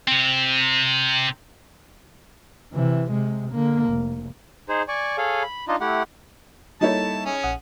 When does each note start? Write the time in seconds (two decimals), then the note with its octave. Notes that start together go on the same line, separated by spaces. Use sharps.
0.07 C3 C4
2.73 C3 E3
3.12 C3 G#3
3.51 D3 A#3
3.90 F1
4.69 D#4 G#4 C5
4.88 D5 G#5 C#6
5.18 G#4 A4 C#5 F5 G#5
5.43 B5
5.68 D4 D#4 F4 D#5
5.81 A3 E4 G4 F#5
6.81 G3 A#3 D#4 E4 A4 C#5 A5
7.26 C#4 G#4
7.43 A#1 F#5 D#6